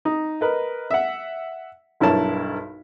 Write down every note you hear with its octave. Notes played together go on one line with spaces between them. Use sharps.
D#4
A#4 B4 D#5
E5 F#5
B1 G2 E4 A#4 C#5 A5